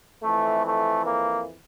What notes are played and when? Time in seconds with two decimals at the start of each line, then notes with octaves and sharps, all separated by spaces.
0.23 F2 E3 A3
0.64 A3
1.05 A#3